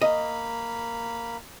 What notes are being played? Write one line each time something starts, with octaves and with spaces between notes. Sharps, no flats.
A#3 D#5 F5 B5